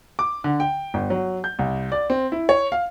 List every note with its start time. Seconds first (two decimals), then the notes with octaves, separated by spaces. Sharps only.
0.19 D6
0.44 D3
0.60 G5
0.94 G1
1.10 F#3
1.44 G6
1.59 C2
1.92 D5
2.10 C4
2.32 E4
2.49 C#5
2.72 F5